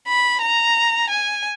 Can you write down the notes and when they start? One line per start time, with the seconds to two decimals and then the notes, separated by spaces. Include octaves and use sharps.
0.08 B5
0.42 A#5
1.10 G#5